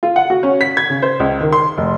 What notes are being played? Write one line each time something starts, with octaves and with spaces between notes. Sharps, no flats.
F4
F#5
F#4
C#4
B6
G#6
C#3
C5
C#2
D#3
C6
F1